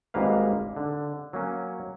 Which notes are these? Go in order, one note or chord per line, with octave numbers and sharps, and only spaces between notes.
G#1 G#2 G3 A#3 B4 F5
D3
F#3 A#3 C#4